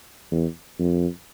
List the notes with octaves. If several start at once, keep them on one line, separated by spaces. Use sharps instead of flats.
E2
F2